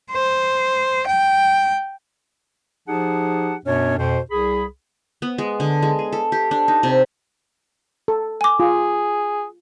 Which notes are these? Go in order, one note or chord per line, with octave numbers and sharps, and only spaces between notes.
C5
G5
F3 D#4 G4 G#4 F#5 A5
F#2 B2 B3 C#4 D4 C#5
F2 B2 C5
C2 G#4 B5
B3
G#3
D3
G#3
G#4
A4
G4
D4
D#4
C3
A4
G#5 D6
F4 G#4